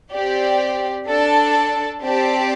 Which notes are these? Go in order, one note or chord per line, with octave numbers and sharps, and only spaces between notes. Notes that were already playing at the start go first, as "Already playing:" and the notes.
C4 G4 D5
D4 A4 D5 A5
C4 G4 D5 A5